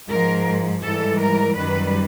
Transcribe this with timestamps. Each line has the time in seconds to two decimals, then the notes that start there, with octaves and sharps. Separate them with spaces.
0.09 G#2 F3 A#4
0.83 G#2 E3 G3 A4
1.20 A#4
1.57 F#2 D#3 G3 B4